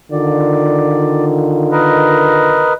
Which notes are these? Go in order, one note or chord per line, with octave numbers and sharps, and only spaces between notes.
D3 D#3 F4 D5
A#4 B4 D#5